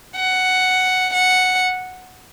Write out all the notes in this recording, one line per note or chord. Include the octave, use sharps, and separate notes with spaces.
F#5
F#5